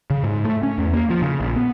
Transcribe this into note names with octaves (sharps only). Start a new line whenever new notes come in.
C#3
G#2
A3
C#4
E2
A#3
F3
C#3
A#1
B3